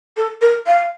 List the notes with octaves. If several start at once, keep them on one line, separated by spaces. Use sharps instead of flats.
A4
A#4
F5